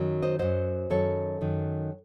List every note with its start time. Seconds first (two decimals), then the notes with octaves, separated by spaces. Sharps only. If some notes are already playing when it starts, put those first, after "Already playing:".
Already playing: F#2 D#3 F#3
0.22 C5 D#5
0.39 F#2 D#3 F#3 C5 D#5
0.90 F#2 D#3 F#3 A4 C#5
1.41 F#2 D#3 F#3